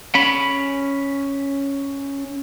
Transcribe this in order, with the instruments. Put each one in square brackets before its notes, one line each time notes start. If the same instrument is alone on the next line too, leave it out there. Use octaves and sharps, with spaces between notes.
[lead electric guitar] C#4 B5